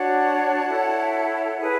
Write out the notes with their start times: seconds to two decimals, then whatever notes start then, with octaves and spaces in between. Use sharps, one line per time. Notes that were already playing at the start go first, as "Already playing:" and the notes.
Already playing: D4 F#4 C#5 F#5 A5
0.68 E4 A4 C#5
1.57 E4 G#4 B4